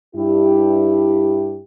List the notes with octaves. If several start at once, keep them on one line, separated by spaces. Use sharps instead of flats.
G2 E4 G4